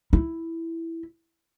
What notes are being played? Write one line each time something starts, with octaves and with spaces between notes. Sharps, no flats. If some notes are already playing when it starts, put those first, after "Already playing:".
E4